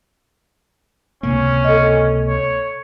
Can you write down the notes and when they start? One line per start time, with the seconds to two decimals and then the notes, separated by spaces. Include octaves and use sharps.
1.23 C#2 C3 A#3 C#4
1.64 A4 D#5
2.27 C#5